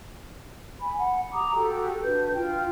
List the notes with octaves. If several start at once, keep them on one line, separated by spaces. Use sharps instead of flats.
G#5 B5
F#5
G4 A#5 D6 D#6
F#4 G4 A4 G5
D4 F#4 B4 G6
F4 G5